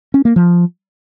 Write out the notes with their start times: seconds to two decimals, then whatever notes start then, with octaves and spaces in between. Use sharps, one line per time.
0.14 C#4
0.25 A#3
0.36 F3